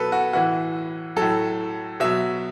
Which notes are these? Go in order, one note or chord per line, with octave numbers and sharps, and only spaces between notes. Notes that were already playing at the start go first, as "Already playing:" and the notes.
Already playing: B2 F#3 A4 B4
F#4
A2 E3 F#4
F#3 A4
A2
B2 F#3 E5